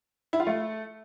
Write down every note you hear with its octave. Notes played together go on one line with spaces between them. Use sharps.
E4
F4
A3